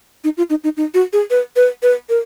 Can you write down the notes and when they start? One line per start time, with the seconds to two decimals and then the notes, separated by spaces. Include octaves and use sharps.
0.24 D#4
0.37 F4
0.50 D#4
0.64 D#4
0.77 D#4
0.94 F#4
1.13 G#4
1.30 B4
1.56 B4
1.83 B4
2.09 A#4